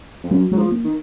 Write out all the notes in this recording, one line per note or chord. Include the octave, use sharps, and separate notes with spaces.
F2
F#2 F#3
F#3 G#3
F3
A#3
D#3